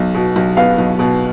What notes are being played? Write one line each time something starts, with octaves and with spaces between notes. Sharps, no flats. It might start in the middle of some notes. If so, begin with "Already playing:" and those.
Already playing: B1
B2
B1
B3 F5
B1
B2